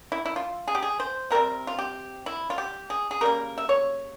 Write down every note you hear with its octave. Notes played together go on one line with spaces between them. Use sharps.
E4
E4
F4
G#4
G4
G#4
C5
C3 G3 C4 A#4
F4
G4
E4
F4
G4
G#4
G#4
C#3 G3 A#3 A#4
E5
C#5